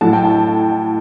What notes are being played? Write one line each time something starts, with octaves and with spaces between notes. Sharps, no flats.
A2 F#3 A3 A5
G5
A5